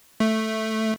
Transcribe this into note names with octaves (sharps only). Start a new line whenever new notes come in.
A3